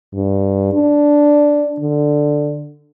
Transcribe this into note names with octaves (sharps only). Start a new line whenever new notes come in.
G2
D4
D3